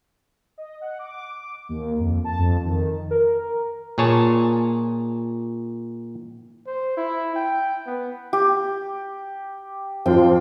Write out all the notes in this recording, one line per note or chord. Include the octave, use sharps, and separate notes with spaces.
D#5
F#5
D6
D#2
F2
A5
F2
D#3
A#4
A#2 G#4 C#5 A5
C5
E4
G5
B3
G4
F2 F4 G5